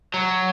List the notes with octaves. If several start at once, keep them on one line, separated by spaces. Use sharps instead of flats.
F#3